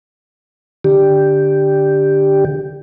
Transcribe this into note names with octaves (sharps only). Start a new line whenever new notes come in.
D3 G4